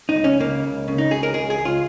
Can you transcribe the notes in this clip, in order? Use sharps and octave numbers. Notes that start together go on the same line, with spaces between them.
D#4
C#2
C#4
C#3 A#3
C#2
C#3
D#4
C#2 G#4
A#4
C#2 G#4
G#4
C#2
F4